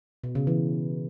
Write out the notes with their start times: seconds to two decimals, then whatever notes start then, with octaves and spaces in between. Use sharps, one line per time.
0.24 B2
0.35 C#3
0.47 E3